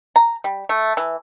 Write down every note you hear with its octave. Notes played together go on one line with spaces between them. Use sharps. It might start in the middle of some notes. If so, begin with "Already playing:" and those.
A#5
G3
A3
E3